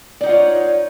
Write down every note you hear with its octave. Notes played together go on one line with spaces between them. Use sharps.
D#4 F4 C#5 D5 F#5